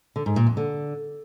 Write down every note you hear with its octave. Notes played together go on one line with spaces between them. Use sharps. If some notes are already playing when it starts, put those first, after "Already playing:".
D3
G#2
A#2
F2
D3